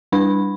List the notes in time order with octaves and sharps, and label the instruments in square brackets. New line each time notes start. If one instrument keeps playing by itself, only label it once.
[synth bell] G3 D4 B5